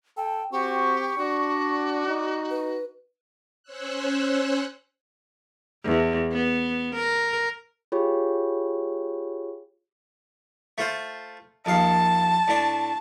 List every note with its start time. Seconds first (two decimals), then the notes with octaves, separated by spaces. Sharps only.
0.17 A4 G5
0.52 C4 F#4 G4 C#6
1.18 D4 F#4 D5
2.07 D#4
2.50 B4
3.63 C#4 C5 C#5 E6 F#6
5.84 E2
6.32 B3
6.96 A#4
7.92 F4 G4 G#4 C#5
10.78 A3 F4 C5
11.66 A#1 D#2 F5 A5
12.48 A2 D4